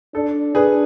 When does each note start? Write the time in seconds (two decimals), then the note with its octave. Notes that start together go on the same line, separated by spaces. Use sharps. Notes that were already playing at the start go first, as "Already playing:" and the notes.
0.15 D4 A4
0.55 D4 G#4 B4